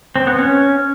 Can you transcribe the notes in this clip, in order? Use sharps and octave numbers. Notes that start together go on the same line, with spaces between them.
C4
B3
C#4